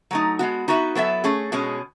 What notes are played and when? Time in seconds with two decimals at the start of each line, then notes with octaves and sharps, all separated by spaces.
0.11 F#3 A3 D#4
0.39 G#3 B3 F#4
0.68 B3 D#4 F#4 B4 E5
0.95 F#3 B3 E4 A4 E5
1.24 A3 C#4 G#4
1.52 B2 G#3 C#4